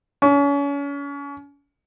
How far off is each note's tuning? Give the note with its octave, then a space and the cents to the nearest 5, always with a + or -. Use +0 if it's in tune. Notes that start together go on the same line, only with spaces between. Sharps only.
C#4 +35